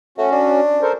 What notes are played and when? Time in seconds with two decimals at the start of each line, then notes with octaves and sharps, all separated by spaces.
0.18 A3 C#4 F#4
0.32 D4
0.82 A4 A#4 C5